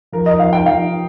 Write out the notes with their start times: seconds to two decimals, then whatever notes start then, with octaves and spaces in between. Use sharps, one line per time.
0.12 F3 A#4
0.26 D#5
0.39 F3 F5
0.53 G5
0.66 F3 F5